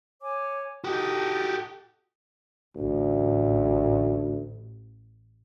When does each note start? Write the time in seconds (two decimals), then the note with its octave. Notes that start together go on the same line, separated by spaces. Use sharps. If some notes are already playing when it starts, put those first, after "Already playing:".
0.21 C#5 G#5 D6
0.84 D#4 F#4 G4 A4 D#6
2.76 A1 D2